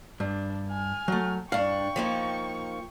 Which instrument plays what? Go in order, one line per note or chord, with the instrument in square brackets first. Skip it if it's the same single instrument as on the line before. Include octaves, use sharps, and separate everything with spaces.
[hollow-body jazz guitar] G2 [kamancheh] D4
[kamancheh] G#5 F6
[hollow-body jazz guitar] F#3 A3
[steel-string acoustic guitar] G2 D4 [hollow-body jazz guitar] F5 [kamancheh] G5 C#6
[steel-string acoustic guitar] F3 A#3 D#4